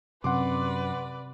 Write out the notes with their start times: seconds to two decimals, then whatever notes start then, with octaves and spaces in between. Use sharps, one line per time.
0.24 F#2 C3 B4 D5 F#5 C6 D6